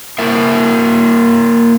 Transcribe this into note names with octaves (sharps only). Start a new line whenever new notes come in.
A#3 E4 A#4 E5